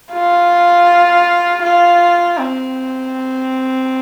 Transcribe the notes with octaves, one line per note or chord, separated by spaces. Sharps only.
F4
F4
C4